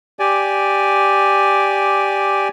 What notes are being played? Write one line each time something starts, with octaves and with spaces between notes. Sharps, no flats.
G4 D5 G#5